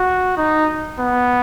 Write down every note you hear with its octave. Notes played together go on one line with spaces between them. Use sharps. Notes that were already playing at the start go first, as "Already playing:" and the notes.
Already playing: F#4
D#4
B3